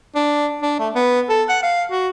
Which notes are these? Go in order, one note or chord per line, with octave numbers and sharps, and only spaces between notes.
D4
D4
A3
B3
A4
F#5
F5
F#4